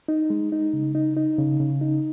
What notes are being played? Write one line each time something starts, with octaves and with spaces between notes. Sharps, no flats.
D#4
G#3
D#4
C#3
D#4
D#4
C#3
C#3
D#4